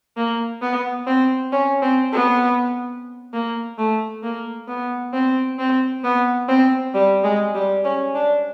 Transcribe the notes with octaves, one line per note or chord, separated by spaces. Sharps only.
A#3
B3
C4
C#4
C4
B3
A#3
A3
A#3
B3
C4
C4
B3
C4
G3
G#3
G3
C#4
D4